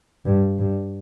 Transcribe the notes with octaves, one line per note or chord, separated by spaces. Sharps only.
G2
G2